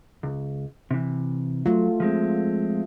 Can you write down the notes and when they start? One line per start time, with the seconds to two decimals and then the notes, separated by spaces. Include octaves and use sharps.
0.23 C#2
0.91 C3 E3
1.66 F#3 A3 F4
2.00 F3 G#3 C4